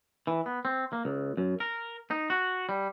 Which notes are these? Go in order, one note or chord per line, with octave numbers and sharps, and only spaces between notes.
E3
B3
C4
A#3
C#2
F#2
A#4
D#4
F#4
G3